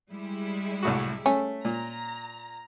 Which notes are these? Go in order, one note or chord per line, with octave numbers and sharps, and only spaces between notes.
G3 G#3 E4
C2 A2 F#4
A3 C#4
A#2 A#5